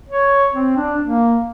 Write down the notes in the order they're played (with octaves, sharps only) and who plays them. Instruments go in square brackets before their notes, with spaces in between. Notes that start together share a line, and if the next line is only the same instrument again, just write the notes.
[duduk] C#5
C4
D4
A#3